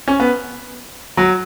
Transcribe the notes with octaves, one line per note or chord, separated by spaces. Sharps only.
C#4
B3
F#3